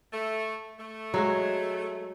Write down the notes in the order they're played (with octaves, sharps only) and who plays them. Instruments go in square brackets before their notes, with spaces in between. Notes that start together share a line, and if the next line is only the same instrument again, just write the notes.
[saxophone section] A3
A3
[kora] F#3 G#3 F#4